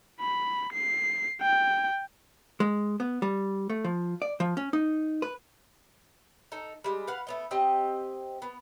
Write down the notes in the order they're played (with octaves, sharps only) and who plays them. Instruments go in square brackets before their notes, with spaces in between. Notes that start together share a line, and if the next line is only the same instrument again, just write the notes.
[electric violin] B5
C7
G5
[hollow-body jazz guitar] G#3
B3
G3
A3
F3
D5
F3
C#4
D#4
B4
[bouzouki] D#4 A4
G3 G#3
B4 F5 F#5
A3 B3 D#5
C4 G4 D#5
B3